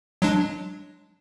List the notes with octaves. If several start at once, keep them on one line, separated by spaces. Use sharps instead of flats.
F#3 G#3 D4